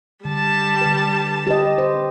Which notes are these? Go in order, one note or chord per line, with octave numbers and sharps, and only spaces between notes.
D3 G3 A5
D3 B4
G4 B4 D#5
C5